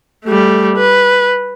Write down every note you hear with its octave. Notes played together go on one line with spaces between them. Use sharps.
G3 A3
B4